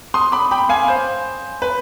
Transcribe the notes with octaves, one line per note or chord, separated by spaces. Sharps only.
C6 D#6
B5 D6
G5 B5
F5 G#5
C5
B4